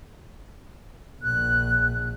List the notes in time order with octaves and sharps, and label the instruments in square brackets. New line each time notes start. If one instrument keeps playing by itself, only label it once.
[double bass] A#1 [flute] F#6